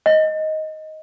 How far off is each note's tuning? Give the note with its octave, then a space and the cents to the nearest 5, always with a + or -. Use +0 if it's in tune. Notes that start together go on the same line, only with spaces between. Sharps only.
D#5 +5